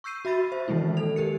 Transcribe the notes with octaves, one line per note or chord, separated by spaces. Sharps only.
C#6 E6 G6 C7 D#7
F#4 E5 B5 A6
C5 E5
D#3 E3 G#3 A#3 E4
A4 F7
D#3 G4 A#4 C#7